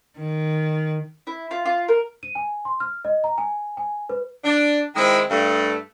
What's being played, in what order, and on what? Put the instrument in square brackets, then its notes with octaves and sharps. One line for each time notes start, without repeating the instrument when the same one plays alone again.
[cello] D#3
[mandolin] E4
F4
F4
A#4
[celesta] D#7
G#5
C6
F6
D#5
A#5
G#5
G#5
B4
[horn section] D4
D#3 G#3 C4 E4
G2 A3